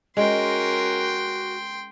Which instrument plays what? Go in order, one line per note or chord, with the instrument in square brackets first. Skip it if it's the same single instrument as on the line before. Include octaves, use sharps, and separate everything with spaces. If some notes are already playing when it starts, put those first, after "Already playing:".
[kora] G#3 [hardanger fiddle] C#4 A#4 [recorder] F#4 [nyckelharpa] G5 C6